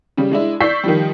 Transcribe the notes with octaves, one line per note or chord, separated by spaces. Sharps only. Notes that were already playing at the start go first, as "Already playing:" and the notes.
C#3 G3
G#3 D4 E4
D5 C#6 E6 G6 B6 C7
D#3 F3 G3